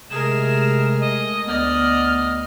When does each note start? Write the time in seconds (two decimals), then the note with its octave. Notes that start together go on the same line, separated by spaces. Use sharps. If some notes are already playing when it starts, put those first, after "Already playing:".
0.10 C3 G#3 A3 G#4 A#4 E7
1.00 D#5
1.47 D2 B3 D5 D#5 F6